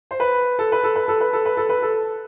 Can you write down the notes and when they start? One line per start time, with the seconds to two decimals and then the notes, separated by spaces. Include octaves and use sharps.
0.11 C5
0.20 B4
0.59 A4
0.72 B4
0.83 A4
0.95 B4
1.08 A4
1.21 B4
1.33 A4
1.45 B4
1.57 A4
1.69 B4
1.82 A4